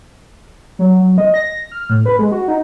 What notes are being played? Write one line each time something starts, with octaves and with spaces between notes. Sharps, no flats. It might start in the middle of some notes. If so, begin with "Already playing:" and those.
F#3
F#3
D#5
A#6
F6
A2
B4
G#3
F#4
D#4